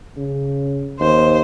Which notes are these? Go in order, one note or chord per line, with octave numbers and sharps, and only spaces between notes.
C#3
D#2 C5